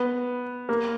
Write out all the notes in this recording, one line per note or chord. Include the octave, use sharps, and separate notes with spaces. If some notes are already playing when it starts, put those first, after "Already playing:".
Already playing: B3
A#3